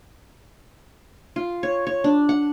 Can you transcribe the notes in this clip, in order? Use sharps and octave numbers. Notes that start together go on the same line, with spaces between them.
F4
C#5
C#5
D4
F#5